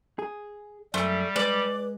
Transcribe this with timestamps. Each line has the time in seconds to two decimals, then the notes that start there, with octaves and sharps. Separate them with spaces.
0.19 G#4
0.94 F#2 G3 A3
1.36 G#3 B4 D5